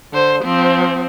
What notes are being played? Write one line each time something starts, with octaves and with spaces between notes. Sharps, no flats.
D3 C5
F3 C4